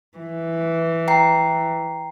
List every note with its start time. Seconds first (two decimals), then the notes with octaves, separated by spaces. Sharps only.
0.18 E3
1.08 G5 A#5 C7